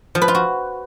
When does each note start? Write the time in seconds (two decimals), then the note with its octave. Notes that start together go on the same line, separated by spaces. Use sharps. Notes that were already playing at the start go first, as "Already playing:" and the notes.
0.15 F3
0.22 B4
0.28 F4
0.35 F#4